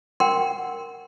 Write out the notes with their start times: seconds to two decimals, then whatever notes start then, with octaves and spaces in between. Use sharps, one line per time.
0.20 A#4 F#5 G5 C6